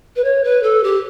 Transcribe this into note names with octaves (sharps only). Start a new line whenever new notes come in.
B4
C#5
B4
A4
G4